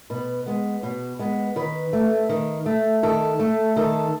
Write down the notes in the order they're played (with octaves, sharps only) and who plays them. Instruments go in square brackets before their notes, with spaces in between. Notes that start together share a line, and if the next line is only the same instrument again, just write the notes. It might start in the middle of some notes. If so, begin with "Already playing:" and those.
[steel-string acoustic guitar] B2 B4
G#3 B3
B2
G#3 B3
D#3 B4
A3
D#3
A3
D#3 A4
A3
D#3 A4